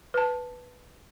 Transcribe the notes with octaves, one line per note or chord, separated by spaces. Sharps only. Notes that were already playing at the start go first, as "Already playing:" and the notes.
B4 A5